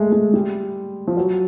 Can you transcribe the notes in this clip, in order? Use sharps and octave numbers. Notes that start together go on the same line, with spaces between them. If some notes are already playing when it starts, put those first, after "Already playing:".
Already playing: G#3 A3
G#3
G3
F3
F#3